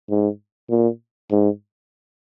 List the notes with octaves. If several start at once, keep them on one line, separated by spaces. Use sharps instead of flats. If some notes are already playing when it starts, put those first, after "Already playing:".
G#2
A#2
G#2